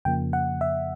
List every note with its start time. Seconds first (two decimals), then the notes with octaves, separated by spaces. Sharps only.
0.05 F2 C#3 F3 A#3 G5
0.33 F#5
0.61 E5